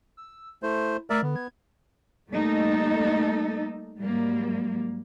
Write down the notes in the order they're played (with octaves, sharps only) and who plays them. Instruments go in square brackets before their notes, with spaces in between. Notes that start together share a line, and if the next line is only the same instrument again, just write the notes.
[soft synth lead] E6
[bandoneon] A3 C5 [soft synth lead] E4
[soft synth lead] A3 [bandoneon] A#4 D5 E5
[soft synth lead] D3 [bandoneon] B3
[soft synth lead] G#6
[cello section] G3 A3 A#3 D#4 A4
G#2 F#3 G3 A#3